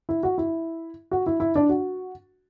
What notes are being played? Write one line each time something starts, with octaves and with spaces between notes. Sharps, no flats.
E4
F#4
E4
F#4
E4
E4
D4
F#4